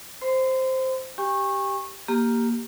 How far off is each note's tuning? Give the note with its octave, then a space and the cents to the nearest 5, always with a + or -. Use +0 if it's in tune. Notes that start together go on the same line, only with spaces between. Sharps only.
C5 +0 C6 -35
G4 -5 G5 +45 C#6 -20
A#3 +0 G4 +0